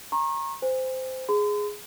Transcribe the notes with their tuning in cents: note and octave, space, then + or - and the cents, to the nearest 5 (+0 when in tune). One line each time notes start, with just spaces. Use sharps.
A#5 +5 C#6 -35
C5 -15 G#5 -35
G#4 +0 C6 -45